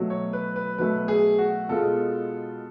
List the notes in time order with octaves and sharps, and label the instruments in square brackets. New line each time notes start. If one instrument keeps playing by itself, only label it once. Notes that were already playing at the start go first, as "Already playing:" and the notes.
Already playing: [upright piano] B2 F#3 A3
[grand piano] C#5
B4
B4
[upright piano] B2 F#3 A3 [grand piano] B4
[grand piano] G#4
F#4
[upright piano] B2 G#3 B3 F4 [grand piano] A4